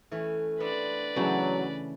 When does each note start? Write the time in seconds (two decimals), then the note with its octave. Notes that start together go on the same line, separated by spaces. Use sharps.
0.11 E3 A3 C#4
0.60 B3 C4 D4 B4 D5
1.16 C#3 E3 F#3 A3